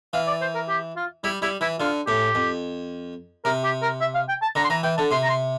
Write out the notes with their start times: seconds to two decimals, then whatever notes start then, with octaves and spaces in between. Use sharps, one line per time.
0.14 E3 F5
0.27 D5
0.41 C5
0.55 A#4
0.69 G4
0.96 F4
1.24 G3 E4
1.42 G3 E4
1.61 E3 E4
1.79 D3 F4
2.07 A2 G4
2.35 F2
3.45 C3 A#4
3.64 G4
3.82 A#4
4.01 E5
4.14 F5
4.29 G5
4.42 A5
4.55 D3 A#5
4.64 C6
4.70 E3 A#5
4.83 E3 G5
4.98 D3 A5
5.11 C3 C6
5.23 A#5
5.30 C6